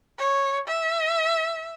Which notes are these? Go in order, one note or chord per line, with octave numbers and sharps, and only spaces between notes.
C#5
E5